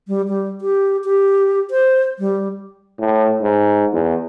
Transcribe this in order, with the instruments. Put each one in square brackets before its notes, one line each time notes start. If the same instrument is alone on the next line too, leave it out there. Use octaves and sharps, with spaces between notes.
[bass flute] G3
G3
G4
G4
C5
G3
[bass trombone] A2
G#2
E2